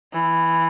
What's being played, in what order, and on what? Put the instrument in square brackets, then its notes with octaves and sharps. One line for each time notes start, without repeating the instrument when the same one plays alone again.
[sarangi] E3